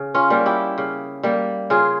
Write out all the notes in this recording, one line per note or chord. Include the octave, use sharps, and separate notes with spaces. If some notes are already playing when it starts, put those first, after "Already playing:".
Already playing: C#3
C#4 F4
G3 A#3
E4 G4
C#3
G3 A#3
C#3 F4 G#4